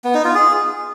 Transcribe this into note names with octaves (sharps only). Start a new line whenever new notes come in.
B3
D#4
F4
G#4